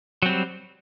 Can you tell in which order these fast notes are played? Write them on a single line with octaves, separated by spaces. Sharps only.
F#3 C4 G3